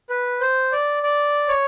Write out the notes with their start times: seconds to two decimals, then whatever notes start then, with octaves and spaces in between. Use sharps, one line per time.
0.10 B4
0.41 C5
0.72 D5
1.03 D5
1.48 C#5